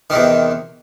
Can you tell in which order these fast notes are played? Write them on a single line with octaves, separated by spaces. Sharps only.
D#3 C3 E2